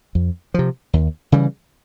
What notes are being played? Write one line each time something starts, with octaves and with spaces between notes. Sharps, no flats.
F2
C3 F3
D#2
C#3 E3 G3